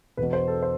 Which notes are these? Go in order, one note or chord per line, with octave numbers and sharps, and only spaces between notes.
E1 E2 B2 B4
C5
A4
C5